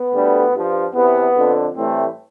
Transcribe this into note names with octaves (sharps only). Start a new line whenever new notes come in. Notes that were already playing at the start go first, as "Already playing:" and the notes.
Already playing: B3
D2 D3 G3
G2 F3
E2 C3 E3 B3
F2 D3 F3
A2 E3 G3 A3 C4